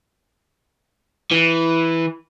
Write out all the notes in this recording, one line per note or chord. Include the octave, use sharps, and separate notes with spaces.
E3